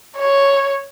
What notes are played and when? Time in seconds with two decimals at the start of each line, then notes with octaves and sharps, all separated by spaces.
0.17 C#5